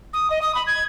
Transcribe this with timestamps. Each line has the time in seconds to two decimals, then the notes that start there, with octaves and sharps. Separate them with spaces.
0.13 D#6
0.30 D#5
0.41 D#6
0.54 B5
0.66 G#6